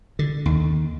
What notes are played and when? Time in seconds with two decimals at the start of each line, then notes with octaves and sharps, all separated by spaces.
0.19 D3
0.46 D#2